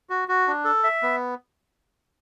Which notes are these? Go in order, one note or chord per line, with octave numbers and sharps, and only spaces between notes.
F#4
F#4
D4
A4
E5
B3